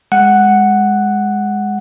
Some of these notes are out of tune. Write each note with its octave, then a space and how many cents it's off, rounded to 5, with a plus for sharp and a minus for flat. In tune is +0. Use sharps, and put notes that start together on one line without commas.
G#3 -10 F#5 +0